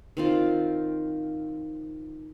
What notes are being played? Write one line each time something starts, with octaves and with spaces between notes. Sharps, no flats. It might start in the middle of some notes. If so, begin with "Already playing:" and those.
D#3 C4 F4